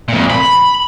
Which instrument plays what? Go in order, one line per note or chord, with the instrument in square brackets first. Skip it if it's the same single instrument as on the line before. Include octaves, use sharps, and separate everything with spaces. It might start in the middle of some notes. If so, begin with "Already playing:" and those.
[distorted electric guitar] F2 A#2
B5